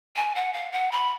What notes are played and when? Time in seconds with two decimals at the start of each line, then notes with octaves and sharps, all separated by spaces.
0.16 G#5
0.35 F#5
0.53 F5
0.72 F#5
0.92 B5